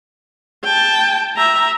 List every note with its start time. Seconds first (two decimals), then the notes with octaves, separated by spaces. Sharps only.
0.64 G5 A5
1.36 E5 A#5